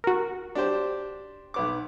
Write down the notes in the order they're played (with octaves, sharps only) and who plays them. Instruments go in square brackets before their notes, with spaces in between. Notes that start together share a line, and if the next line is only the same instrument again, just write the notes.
[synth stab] F#4 A#4
[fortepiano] D4 G4 C5
B1 B3 D6